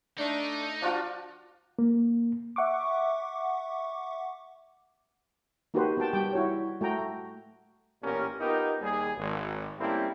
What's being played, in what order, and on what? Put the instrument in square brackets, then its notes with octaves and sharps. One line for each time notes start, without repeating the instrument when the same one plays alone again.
[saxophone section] A3 D4 [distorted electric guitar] D#4
[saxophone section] F3 [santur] D4 F4 F#4
[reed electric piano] A#3
[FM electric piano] E5 F#5 C#6 D6
[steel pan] A#3 D#4 F#4 G4 B4 C5
B3 F#4 G5 A5
G3 G4 G5
E4 F#4 C#5
A3 F#4 G5 A#5
[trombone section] A1 A#2 B3 C#4 G4 A#4
B3 D#4 F4 G4 A#4
D#2 G3 G#4
G#1
G3 A3 A#3 C4 C#4 E4